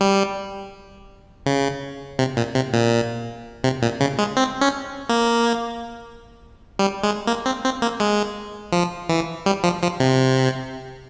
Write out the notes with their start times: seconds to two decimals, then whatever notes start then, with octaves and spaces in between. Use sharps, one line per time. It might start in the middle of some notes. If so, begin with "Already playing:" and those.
0.01 G3
1.46 C#3
2.19 C3
2.37 A#2
2.55 C3
2.73 A#2
3.64 C3
3.82 A#2
4.01 C#3
4.19 G#3
4.37 C4
4.61 C#4
5.09 A#3
6.79 G3
7.04 G#3
7.27 A#3
7.46 C4
7.64 C4
7.82 A#3
8.00 G#3
8.73 F3
9.09 E3
9.46 G3
9.64 F3
9.82 F3
10.00 C3